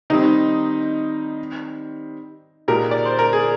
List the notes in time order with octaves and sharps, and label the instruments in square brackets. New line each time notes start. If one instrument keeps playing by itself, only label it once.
[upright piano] D#3 G3 C4 [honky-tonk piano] D#4
[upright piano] A#2 G#3 D#4 G4 [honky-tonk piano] A#4
[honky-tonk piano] D5
C5
A#4
G#4